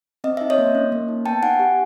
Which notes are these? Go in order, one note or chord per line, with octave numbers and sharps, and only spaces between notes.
C4 D#5
D#4 E5
C#5 D#5
A#3
C#4
A#3
D#4
B3 G5 A5
D#4 F#5 G#5
G4